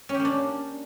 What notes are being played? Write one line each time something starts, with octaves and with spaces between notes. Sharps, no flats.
C#4
G4
A#3
D4